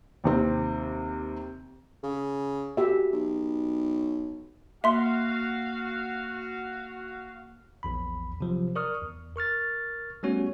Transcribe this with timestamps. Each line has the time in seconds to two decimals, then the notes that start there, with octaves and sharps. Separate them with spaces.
0.24 D#2 C3 C4
2.03 C#3
2.77 F#4 G4 E5
3.13 B1
4.84 A#3 F#4 E5 F5 C6
7.83 A#1 E2 B5
8.41 C3 F3 F#3
8.76 A#4 D5 C#6 D#6 F6
9.02 E2
9.36 A#4 C#6 F6 A6
10.23 G3 A3 B3 C#4 F#4 C#5